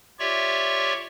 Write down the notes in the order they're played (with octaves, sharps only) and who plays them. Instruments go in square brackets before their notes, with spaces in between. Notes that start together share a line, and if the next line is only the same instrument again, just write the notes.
[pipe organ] F4 G4 C#5 D5 E5 C#6